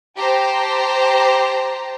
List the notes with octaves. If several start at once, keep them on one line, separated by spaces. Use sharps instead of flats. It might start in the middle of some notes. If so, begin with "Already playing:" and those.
G4 C5 A5 A#5